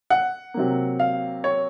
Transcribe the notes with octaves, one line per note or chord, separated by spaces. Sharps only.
F#5
C3 F#3 A#3
F5
C#5